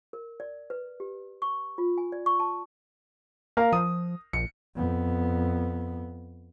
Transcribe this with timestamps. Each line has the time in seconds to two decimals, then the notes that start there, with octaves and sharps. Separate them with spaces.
0.13 A#4
0.40 D5
0.70 B4
1.00 G4
1.42 C#6
1.78 F4
1.98 G#5
2.12 D5
2.26 C#6
2.40 A5
3.57 A#3 A#4 F5 A#5
3.73 F3 D#6
4.33 A#1 C#7
4.76 F2 B3